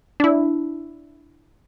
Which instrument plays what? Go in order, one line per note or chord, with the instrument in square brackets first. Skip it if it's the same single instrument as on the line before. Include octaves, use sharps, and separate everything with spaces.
[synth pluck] D4 E4